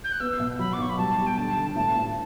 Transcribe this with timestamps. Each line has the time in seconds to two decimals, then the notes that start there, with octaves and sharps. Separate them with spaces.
0.04 G6
0.12 F#6
0.20 B3 E6
0.40 B2
0.59 F#3 B5
0.73 D6
0.78 B1 C#6
0.89 B5
0.98 G3 A5
1.18 G3
1.26 G5
1.37 D3 A5
1.57 D3
1.76 A1 A5
1.96 A1